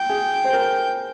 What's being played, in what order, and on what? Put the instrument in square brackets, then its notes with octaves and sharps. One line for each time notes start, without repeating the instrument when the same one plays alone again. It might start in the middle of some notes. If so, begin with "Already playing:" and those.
Already playing: [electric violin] G5
[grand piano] G#4
C5
A#4